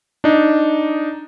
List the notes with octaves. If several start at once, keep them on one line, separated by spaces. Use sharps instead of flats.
D4 D#4